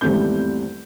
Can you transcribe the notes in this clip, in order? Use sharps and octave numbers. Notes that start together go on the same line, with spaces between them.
G#1 E2 G3 A3 C4 G6